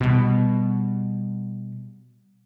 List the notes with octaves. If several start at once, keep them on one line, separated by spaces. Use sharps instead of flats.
B2 G3